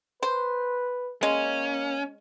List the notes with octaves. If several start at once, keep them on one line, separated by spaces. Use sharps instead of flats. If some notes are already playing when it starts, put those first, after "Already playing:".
B4 C5
G#3 A#3 C#4